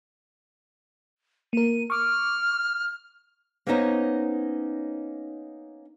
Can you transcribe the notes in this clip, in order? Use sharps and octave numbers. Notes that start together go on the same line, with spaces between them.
A#3 A#4 D#7
C#6 D6 F6
A#3 B3 C#4 D#4 C5 C#5